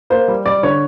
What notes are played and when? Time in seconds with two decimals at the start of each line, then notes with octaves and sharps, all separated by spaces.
0.10 A#3 C5
0.28 G3
0.46 G3 D5
0.63 D3 C#5